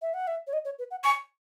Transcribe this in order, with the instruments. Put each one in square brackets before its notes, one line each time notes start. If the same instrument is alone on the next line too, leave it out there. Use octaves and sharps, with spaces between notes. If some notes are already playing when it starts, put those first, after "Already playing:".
[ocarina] E5
F#5
E5
C#5
D#5
C#5
B4
F#5
[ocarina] G#5 [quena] C#6